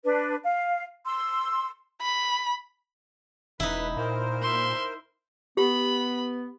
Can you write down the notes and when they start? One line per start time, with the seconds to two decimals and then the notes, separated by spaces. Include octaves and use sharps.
0.04 D4 B4
0.44 F5
1.06 C6 E6
2.02 B5
3.60 E1 D#4 E4 B4
3.97 A#2 A#4 C5
4.42 E5 C6
5.57 B3 G4 B5